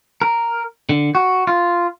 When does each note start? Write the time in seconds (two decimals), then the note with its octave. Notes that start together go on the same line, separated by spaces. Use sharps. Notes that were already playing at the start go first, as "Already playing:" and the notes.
0.22 A#4
0.89 D3
1.15 F#4
1.47 F4